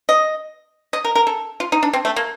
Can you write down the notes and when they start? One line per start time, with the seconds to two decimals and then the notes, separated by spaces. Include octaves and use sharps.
0.09 D#5
0.93 D#5
1.04 A#4
1.15 A#4
1.27 A4
1.60 F4
1.72 D#4
1.83 D4
1.93 C4
2.05 A3
2.16 A#3